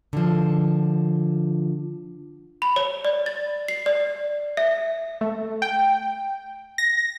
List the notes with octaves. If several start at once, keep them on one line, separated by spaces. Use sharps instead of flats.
D3 F3
B5
C#5
D5
A6
C7
D5
E5
A3
G5
A#6